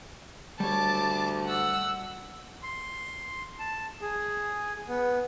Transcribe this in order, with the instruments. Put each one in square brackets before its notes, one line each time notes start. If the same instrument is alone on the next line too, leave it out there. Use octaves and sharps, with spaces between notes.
[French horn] D2 [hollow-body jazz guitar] G3 C#5 [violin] A5 D6
[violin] F#5 E6
[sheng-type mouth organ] C6
A5
G#4
B3